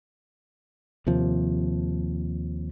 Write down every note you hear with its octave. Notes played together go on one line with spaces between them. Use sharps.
D#2 C3 F3